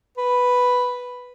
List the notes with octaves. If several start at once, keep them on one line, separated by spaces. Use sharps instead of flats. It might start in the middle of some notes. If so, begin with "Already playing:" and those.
B4